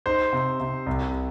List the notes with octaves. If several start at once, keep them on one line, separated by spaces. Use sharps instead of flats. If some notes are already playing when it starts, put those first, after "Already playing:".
D#4 C5
C3
C3
C2